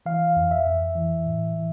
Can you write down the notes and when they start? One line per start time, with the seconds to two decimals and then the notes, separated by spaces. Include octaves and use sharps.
0.06 E3 F5
0.36 F2
0.51 E5
0.66 F2
0.96 E3
1.26 A2
1.56 E3